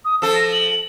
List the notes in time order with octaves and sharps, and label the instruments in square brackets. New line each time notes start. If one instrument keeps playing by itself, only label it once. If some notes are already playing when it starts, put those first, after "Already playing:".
[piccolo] D#6
[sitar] F3 A4 [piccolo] E6
[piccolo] A#6
F#7